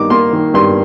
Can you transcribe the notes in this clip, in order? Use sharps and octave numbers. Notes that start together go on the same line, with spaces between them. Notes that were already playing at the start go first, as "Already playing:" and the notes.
Already playing: G2 D#3 A#3 D#4 D6
A#3 C6
D#3
G2 C6